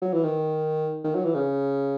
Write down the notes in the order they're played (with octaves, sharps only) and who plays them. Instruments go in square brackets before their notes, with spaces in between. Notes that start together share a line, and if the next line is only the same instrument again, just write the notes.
[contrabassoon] F#3
E3
D#3
D#3
F#3
E3
C#3